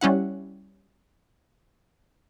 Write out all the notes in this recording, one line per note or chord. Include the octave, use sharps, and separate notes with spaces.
G3 C#4 E4 F#5